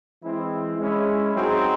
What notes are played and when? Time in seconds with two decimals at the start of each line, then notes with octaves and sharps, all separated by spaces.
0.22 E3 G#3 C4 E4
0.78 G#3 C#4 E4
1.34 F#3 C4 D#4 G#4 C5